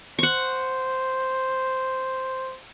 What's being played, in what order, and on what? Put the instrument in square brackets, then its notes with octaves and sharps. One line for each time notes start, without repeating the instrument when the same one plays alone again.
[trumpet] C5 [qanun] F#5 C#6